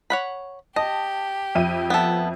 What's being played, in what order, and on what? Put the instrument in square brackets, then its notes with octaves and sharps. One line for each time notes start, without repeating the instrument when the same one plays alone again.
[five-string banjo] C#5 F#5 B5
[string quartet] G4 [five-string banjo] D#5 [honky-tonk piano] A5
[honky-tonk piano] F2 E5 D#7
[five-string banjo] B3 A4